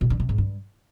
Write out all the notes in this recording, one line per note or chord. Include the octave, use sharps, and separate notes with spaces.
B2
D3
C3
G#2
G2